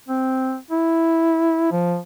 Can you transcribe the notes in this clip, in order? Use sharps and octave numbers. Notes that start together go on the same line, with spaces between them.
C4
E4
F3